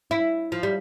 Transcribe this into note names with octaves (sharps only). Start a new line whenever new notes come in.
E4
F3
G3